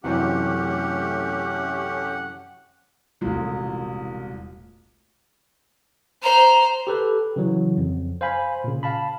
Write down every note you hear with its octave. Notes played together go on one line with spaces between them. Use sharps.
F#2 C3 E3 A3 C#4 G4 F#5
E1 C2 A#2 A3 F4
C5 A#5
G4 A4 B4
C#3 E3 F#3
F2
C5 F5 G#5 B5
A#2 C#3
F5 A5 B5